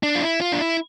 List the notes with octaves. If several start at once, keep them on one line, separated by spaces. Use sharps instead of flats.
D4
F4
E4
F4
D4
E4